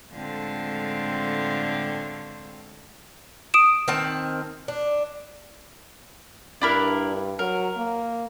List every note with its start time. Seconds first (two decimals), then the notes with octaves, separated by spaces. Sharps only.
0.12 A2 D3 G#3 C4 F4 A4
3.54 D#6 D7 E7
3.88 D#3 C4 A5
4.68 D4
6.61 G2 D4 E4 A#4
7.39 F#3 A#4
7.76 A#3